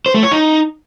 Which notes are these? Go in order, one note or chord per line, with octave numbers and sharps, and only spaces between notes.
C5
A3
C#5
D#4